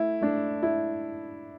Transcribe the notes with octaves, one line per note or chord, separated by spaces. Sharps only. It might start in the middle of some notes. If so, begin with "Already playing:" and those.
Already playing: A3 E4
A3 D4
E4